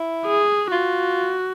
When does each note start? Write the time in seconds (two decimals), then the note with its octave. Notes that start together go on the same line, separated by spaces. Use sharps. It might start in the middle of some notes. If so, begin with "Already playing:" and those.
Already playing: E4
0.26 G#4
0.72 F4 F#4